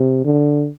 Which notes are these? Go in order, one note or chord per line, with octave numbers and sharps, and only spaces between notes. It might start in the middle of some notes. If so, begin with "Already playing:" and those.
Already playing: C3
D3